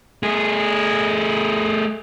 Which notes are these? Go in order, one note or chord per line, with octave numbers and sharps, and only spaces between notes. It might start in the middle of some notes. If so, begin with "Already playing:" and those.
A3 G#4